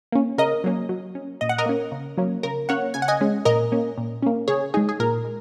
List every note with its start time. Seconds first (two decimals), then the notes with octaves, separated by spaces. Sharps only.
0.12 A#3 C#4
0.38 C#3 A#4 D#5
0.64 F#3 A#3 C#4
0.89 F#3
1.15 C#4
1.41 A#2 D#5
1.49 F#5
1.58 A#4 D#5
1.66 A#3 C#4
1.92 C#3
2.17 F#3 A#3 C#4
2.43 C#3 A#4
2.69 A#3 C#4 C#5 F#5
2.94 C#3 G#5
3.02 F#5
3.08 D#5 G#5
3.21 G#3 C#4
3.45 A#2 A#4 D#5
3.72 A#3 C#4
3.98 A#2
4.22 A#3 C#4
4.48 C#3 G#4 C#5
4.74 G#3 D#4 G#4
4.89 G#4
4.99 A#2 A#4
5.24 G#3